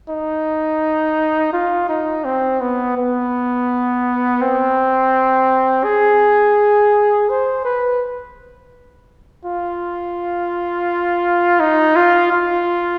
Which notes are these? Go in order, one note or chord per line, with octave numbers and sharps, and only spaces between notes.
D#4
F4
D#4
C4
B3
B3
C4
G#4
C5
B4
F4
D#4
F4
F4